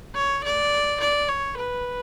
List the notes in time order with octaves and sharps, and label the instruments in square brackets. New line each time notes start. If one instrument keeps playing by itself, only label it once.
[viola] C#5
D5
D5
C#5
B4